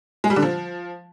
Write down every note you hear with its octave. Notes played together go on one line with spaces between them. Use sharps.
G#3
G3
D3
F3